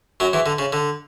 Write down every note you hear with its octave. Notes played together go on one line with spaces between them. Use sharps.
F#2 F#3
E2 E3
D3
C#3
D3